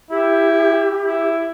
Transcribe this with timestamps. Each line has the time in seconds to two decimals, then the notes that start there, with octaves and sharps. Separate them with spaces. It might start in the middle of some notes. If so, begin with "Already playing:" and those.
0.11 E4 G4
1.05 E4